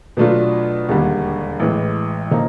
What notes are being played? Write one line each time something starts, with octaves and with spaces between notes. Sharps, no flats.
B2 F#3 A3 D4 F4
E1 D#2 D3 G3
A1 A2 E3 G#3
C#3 F3 A#3 D#4